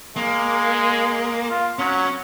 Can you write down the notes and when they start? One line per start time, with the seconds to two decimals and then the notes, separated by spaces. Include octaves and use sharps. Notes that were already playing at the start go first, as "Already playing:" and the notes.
0.16 G#3 A#3
1.49 F4
1.79 F#3 C#4